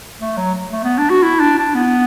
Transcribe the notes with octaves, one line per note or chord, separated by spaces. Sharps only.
A3
F#3
A3
B3
D4
F#4
E4
D4
D4
B3